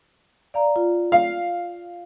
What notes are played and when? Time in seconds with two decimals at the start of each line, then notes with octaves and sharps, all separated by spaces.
0.54 D5 F5 A#5
0.76 F4
1.12 F5